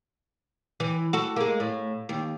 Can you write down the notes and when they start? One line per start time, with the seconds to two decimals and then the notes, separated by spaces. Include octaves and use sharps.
0.80 E3
1.13 F#4 A4
1.36 G#3 A#3
1.60 A2
2.09 D#2